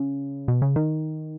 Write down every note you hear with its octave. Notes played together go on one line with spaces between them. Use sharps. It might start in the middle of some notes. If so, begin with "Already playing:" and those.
Already playing: C#3
B2
C#3
D#3